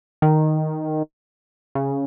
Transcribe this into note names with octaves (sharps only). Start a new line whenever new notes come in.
D#3
C#3